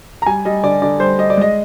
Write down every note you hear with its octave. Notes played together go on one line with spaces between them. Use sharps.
A#5
G3 G#5
G3 D#5
D3 D5
D3 D5
G3 C5
G3 D#5
D5
G#3 D#5